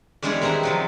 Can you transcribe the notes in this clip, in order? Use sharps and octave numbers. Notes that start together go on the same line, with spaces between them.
E2 G3 G#3 D4 E4 C#5
D#3 C4 D#4 B4 D#5
C3 F3 F#3